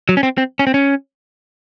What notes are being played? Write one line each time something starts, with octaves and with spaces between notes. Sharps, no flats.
F#3
C#4
C4
C4
C#4
C4
C#4